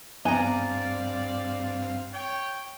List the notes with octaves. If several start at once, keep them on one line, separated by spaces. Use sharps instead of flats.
G2 B3 C4 D5 F5 G#5 A#5
C#5 G5